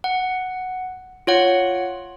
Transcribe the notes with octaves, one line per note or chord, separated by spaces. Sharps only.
F#5
F4 C#5 F#5